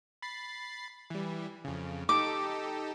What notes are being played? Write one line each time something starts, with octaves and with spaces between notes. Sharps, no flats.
B5 A6 C7
E3 G3
F2 C#3
D#4 G4 A4 D6